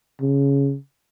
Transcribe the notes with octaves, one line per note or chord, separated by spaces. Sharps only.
C#3